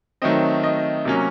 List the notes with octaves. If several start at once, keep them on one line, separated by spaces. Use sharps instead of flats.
D#3 F#3 A3 C4 D#5
D#5
C3 F#3 A#3 C#4